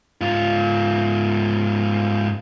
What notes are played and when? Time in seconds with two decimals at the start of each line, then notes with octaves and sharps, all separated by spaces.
0.21 G#2 F4